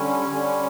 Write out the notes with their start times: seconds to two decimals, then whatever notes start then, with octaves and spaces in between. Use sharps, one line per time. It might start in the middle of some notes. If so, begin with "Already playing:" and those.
Already playing: D3 G3 C#4
0.30 D3 G3 C#4